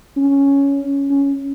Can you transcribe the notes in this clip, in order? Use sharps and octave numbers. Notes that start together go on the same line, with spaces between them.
C#4
C#4